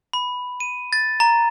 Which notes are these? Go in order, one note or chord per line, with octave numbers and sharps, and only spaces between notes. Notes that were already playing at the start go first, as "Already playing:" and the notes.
B5
D#7
A6
A#5